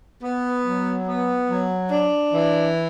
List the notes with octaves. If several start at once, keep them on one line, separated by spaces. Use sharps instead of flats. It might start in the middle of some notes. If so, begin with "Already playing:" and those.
B3
F#3
B3
F#3
D4
E3